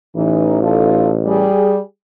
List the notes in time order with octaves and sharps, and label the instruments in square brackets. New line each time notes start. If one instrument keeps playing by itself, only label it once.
[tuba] A1 [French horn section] E3 D#4
[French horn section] D#4 F4 A4
G3 G#4